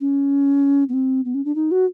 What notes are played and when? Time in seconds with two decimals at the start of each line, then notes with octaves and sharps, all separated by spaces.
0.01 C#4
0.89 B3
0.93 C4
1.25 B3
1.34 C#4
1.45 D4
1.55 D#4
1.71 F#4